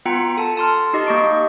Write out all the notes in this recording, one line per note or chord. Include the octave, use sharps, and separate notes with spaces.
B3 F4 G5 A#5 C#7
A4 A5
A5 C6 F6
D#4 G4 D#5
A#3 D#5 C#6 D7